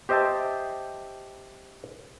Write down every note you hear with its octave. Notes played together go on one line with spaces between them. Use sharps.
G4 C5 D#5 E5 G5 A5